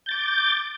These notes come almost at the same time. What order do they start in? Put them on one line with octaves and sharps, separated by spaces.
G6 A6 D6